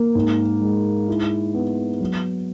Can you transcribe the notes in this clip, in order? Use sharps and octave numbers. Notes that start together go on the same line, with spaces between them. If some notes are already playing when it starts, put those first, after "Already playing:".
Already playing: A#3
G#2
G#3
E4
B3
F#3